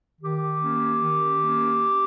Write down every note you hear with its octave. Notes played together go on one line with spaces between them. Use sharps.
D#3 G4
A#3 C#4
D#3
A#3 C#4